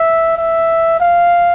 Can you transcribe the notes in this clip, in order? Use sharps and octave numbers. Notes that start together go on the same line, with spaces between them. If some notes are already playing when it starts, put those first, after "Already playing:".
Already playing: E5
E5
F5